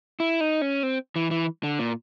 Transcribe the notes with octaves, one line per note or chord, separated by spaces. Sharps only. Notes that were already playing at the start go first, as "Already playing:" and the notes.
E4
D#4
C#4
C4
E3
E3
D3
A#2